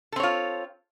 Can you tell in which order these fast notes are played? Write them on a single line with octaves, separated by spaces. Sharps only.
A4 C4 C#5 F4